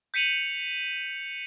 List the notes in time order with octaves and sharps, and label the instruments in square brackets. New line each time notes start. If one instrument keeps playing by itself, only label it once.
[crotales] G6 B6 C#7 D#7 F7 F#7